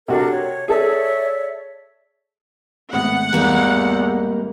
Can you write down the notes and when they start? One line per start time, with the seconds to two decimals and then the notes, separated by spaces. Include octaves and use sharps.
0.08 C3 D4 F#4 A4 A#4
0.30 C#5
0.68 G#4 A4 C#5 D5 E5
2.93 G#1 A2 B3 F#5
3.33 E2 G3 A#3 D#4